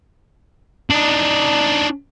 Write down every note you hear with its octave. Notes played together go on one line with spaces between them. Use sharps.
D4 D#4